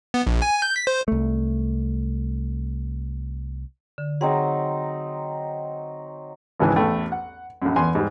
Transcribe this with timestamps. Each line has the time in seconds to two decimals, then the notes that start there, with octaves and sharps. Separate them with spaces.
0.14 B3
0.27 A#1
0.42 G#5
0.62 G6
0.76 B6
0.87 C5
1.08 C2 A3
3.98 D3
4.21 F#3 C4 D#4 G#4 F#5
6.59 G#1 C#2 G#2 E3 B4 G#5
6.76 A1 E2 A3 G5
7.12 F#5
7.62 A#1 F#2
7.76 E2 G#5 C6
7.95 G#2 G3